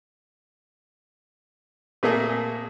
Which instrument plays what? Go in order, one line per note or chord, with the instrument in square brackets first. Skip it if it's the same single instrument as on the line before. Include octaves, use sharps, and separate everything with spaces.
[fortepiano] A#2 A3 A#3 G#4